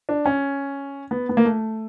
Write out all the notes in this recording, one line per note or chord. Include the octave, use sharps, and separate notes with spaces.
D4
C#4
B3
B3
A#3
A3